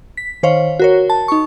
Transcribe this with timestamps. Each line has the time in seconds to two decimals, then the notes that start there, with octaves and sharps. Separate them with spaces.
0.17 B6
0.43 D#3 C5 C#5 F5
0.79 F#4 A#4 C#5
1.10 A5
1.28 D#4 C#6